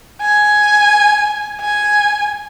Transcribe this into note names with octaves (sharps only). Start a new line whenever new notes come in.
G#5
G#5